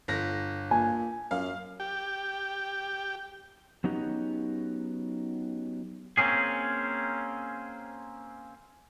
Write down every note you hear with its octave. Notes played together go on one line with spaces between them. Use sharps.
G1 A#6
A#2 G#5
F#2 F5
G4 G5
F#3 B3 C#4 D#4 G4
A#3 C4 C#4 G#4